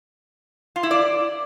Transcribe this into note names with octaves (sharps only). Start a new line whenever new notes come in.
F4
E4
D5